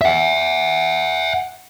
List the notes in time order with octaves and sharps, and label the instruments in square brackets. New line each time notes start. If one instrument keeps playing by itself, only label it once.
[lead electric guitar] E5 F#5